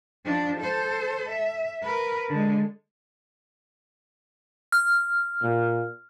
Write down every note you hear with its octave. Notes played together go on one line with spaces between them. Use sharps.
F3 D4
A4 C5
E5
A#4 B4
D3 G#3
F6
A#2